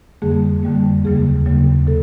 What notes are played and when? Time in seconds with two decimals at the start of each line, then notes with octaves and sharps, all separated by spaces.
0.22 F2 D3 G3 A#3 G#4
0.63 F2 D3 G3 A#3
1.05 D#2 C#3 F#3 A#3 G#4
1.46 D#2 C#3 F#3 A#3
1.87 C3 A4